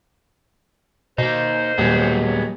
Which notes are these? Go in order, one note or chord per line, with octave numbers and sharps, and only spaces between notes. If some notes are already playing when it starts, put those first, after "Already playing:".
B2 A#3 D#4 C5
D#1 F#3 G#3 B3